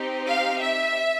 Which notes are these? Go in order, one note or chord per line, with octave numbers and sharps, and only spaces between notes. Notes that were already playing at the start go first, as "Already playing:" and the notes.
Already playing: C4 D#4 G4
F5
E5